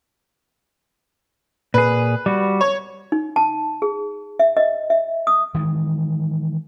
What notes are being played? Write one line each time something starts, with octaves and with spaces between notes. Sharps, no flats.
A#2 G#4 B4
G3 F#4
C#5
D#4
A5
G#4
E5
D#5
E5
D#6
D#3 E3 G#3